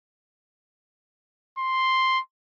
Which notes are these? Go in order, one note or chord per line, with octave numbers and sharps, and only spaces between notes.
C6